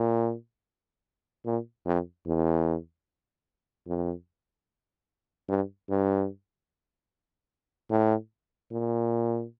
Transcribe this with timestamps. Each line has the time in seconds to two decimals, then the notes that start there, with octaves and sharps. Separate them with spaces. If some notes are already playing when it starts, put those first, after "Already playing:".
Already playing: A#2
1.45 A#2
1.86 F2
2.27 E2
3.87 F2
5.49 G2
5.90 G2
7.91 A2
8.72 A#2